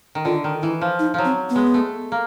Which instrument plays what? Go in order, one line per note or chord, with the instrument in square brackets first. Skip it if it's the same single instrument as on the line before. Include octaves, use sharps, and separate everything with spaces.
[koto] D#3
[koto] D3 [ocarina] F4
[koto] D#3
[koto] E3 [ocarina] E4
[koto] F3
[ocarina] D#4
[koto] F3 F#3
[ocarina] C4
B3
[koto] G#3
A3
A#3